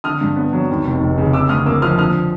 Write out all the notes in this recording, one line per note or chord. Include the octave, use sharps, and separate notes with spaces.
D3 D#6 F6
G2
B3
F#3
D#2
F1
F1
C#3
C#3 D6 E6
D2 D#6 F6
A#3 D6 E6
F3 D#6 F6
D3 D#6 F6